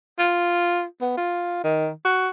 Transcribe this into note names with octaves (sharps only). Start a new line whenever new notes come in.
F4
B3
F4
D#3
F#4